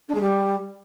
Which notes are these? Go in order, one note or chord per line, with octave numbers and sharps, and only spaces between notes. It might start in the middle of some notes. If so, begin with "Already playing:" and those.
D4
G#3
G3